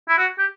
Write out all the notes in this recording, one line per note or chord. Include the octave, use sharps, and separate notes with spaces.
E4
F#4
G4